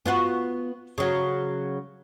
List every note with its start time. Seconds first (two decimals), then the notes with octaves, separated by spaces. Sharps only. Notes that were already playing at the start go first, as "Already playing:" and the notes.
0.06 B3 F4 F#4
0.98 C#3 F#3